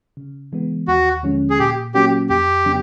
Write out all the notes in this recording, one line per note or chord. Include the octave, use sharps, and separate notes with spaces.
C#3
E3 G#3 B3
D#2 F#4
D3 F3 G#3 C#4
G#4
A#2 G4
F#3 A#3 C#4 F#4 G4
F2 G4
C#3 F#3 B3 D4